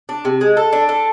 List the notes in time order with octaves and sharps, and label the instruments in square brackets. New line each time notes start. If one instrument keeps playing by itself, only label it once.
[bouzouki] D4
C3
G#3
A4
D4
A4